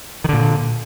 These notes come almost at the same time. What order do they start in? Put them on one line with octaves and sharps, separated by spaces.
D#3 D3 A#2